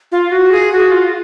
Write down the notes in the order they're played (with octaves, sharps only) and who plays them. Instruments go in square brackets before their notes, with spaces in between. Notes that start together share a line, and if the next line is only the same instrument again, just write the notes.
[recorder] F4
F#4
G#4
F#4
F4